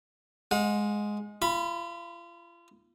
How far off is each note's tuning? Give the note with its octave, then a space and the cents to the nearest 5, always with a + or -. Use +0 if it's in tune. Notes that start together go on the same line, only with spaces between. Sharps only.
G#3 +5 F#5 -45
F4 -35 B5 +0